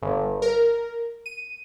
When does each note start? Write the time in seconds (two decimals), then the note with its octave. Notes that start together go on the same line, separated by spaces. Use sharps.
0.02 G1
0.42 A#4
1.26 D#7